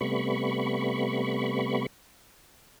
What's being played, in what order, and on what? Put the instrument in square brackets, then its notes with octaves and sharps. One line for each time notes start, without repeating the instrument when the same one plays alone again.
[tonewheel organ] C3 G3 A3 B3 B5 C#6